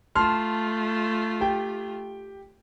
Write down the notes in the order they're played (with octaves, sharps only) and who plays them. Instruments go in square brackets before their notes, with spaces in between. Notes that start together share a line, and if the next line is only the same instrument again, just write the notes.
[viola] A3 F4 [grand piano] A5 C6 F6
[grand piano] G4 G5